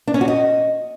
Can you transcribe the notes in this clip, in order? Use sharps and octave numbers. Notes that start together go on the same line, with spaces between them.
D4
C#4
F#4
D#5